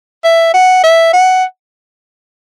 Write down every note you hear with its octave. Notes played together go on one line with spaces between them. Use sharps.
E5
F#5
E5
F#5